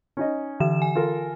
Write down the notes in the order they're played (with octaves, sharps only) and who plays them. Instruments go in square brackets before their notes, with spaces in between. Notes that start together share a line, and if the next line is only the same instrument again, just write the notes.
[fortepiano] C#4 D#4 D#5
[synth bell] D3 E3 E7
G#5
[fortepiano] F4 A4 A#4